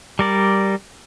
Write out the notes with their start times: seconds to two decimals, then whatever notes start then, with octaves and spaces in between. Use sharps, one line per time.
0.19 G3 A#4 D5